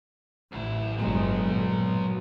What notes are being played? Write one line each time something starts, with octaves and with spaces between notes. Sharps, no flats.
A1 D2 E4
G1 F#3 G#3 B3
A#2